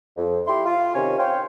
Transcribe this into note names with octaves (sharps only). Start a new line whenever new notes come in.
F2
E4 G4 C6
F4
C3 D#3 C#4 C#5
C5 C#5 F5 G5